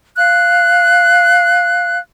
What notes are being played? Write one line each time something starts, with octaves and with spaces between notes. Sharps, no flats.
F5 F#6